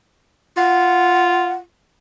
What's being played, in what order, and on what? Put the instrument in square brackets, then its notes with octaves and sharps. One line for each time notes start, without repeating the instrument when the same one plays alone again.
[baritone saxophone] F4 [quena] F#5